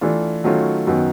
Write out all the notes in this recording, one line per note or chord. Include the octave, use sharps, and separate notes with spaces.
E3 A3 D4 F4
D#3 F#3 A3 C#4 F4
F#2 D#3 F#3 B3